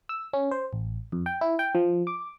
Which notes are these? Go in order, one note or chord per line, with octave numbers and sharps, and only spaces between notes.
E6
C#4
C5
A1
F2
G5
E4
G5
F3
D6